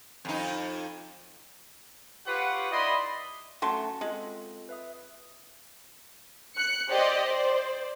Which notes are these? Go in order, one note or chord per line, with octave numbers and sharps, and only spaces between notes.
F2 D#4
F4 G4 B4 C#5 F#5
D#4 E4 D5 D#5 B5 C6
F#3 A3 C#4 F#5 A5 C6
G#3 C4 F4 A4
B4 E5 D#6
F#6 C#7
G4 C5 D5 D#5
C5 D5